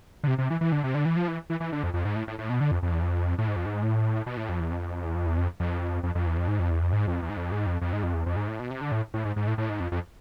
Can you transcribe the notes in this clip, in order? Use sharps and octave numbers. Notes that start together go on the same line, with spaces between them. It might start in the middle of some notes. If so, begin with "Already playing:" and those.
D3
C3
C3
E3
E3
D3
C3
D3
E3
F3
E3
E3
E3
D3
F2
F2
G#2
A2
A2
A2
B2
D3
F2
F2
E2
F2
A2
G#2
F2
G#2
A2
B2
A2
F2
E2
F2
E2
F2
E2
F2
F2
F2
F2
E2
F2
G#2
F2
E2
F2
G#2
F2
E2
G#2
F2
G#2
F2
F2
G#2
F2
E2
F2
G#2
A2
B2
C3
D3
A2
A2
G#2
G#2
A2
A2
G#2
F2
F2